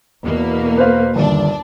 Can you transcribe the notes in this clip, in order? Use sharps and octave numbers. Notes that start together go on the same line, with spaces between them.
E2 B2 A#3
B4 C5 F5
G1 D#2 D4